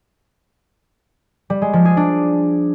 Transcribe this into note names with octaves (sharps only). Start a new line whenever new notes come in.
G3
G#3
F3
G#4
D4